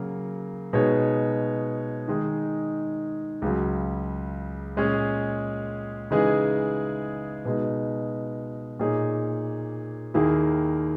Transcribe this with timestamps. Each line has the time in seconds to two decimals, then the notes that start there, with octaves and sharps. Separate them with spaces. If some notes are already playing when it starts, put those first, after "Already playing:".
Already playing: C#3 F#3 A#3
0.73 B2 G#3 D#4 G#4 C#5
2.08 D#3 G#3 D#4 G#4
3.42 C#2 C#3 F#3
4.77 A#2 G#3 C#4 G#4 C#5
6.11 C#3 E3 G#3 D#4 G#4
7.45 B2 G#3 D#4
8.79 A#2 A#3 D#4 G#4 C#5
10.14 D#2 D#3 A#3 E4 G#4